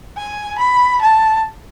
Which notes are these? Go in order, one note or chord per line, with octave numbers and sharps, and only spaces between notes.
G#5
B5
A5